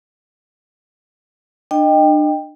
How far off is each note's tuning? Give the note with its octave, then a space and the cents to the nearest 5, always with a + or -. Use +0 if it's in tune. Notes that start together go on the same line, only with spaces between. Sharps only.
D4 +35 D#5 -5 G5 +10